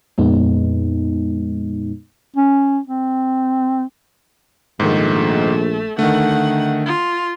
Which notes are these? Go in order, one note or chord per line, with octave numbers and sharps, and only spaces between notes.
F2 A#2 G#3 B3 D#4
C#4
C4
A#1 G#2 D#3 A3
D3 D#3 A3 F#5
F4